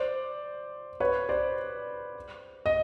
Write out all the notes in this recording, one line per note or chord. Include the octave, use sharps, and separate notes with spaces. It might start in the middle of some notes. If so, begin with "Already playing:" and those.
Already playing: C5 D5
B4 C#5
C5 D5
D#5